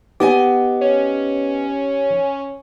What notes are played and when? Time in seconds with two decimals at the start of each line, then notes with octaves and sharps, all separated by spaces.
0.20 B3 D#4 G4 D#5 G#5 D6
0.81 C#4